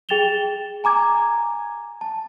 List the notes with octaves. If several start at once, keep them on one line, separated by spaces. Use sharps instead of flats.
G#4 G5 A6 E7 F7 G7
G#5 A#5 D6 G#6
A5